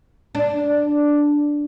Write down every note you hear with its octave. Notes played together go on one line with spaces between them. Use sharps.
D4